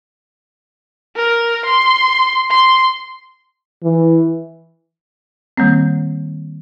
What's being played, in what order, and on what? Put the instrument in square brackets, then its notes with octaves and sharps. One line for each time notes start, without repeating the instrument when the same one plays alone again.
[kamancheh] A#4
C6
C6
[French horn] E3
[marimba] D#3 G3 A#3 C4